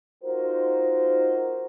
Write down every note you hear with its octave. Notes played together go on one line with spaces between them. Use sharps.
D#4 F4 F#4 A#4 C5